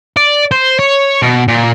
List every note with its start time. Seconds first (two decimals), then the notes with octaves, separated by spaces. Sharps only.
0.17 D5
0.51 C5
0.79 C#5
1.22 B2
1.48 A#2